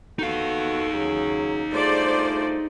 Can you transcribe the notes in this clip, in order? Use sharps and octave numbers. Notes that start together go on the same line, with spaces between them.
B3 D#4 F#4 A4 F5
C#3 F#3 G#4
G2 A3 F4 G#4 C5 D5